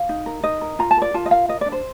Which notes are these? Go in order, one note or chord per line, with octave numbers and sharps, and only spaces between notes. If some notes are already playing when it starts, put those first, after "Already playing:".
Already playing: F5
D#4
A#4
D#4 D#5
A#4
F4 A#5
A5
A#4 D5
F4 A5
D#5
A#4 F5
A#4 D#5
D4 D5
C5